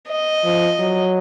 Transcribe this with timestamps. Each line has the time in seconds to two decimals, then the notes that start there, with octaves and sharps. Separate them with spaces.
0.08 D#5
0.44 F3
0.79 F#3